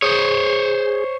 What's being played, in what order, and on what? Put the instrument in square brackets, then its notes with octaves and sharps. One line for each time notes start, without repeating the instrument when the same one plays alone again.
[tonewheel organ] G#4 [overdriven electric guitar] C5 C#5